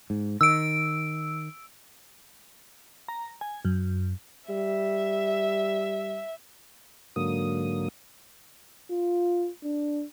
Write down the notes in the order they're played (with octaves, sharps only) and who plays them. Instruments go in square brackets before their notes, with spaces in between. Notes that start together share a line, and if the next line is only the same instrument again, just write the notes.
[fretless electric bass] G#2
[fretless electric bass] D#3 [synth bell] E6 D7
[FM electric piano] A#5
G#5
F#2
[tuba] G3 [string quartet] E5
[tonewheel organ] G#2 D3 F#3 A#3 D#6
[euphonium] F4
D4